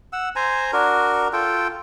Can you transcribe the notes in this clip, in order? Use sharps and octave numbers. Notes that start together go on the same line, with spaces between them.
F#5 E6
C5 G#5 A#5
D4 F#4 A#4
F4 A4 G5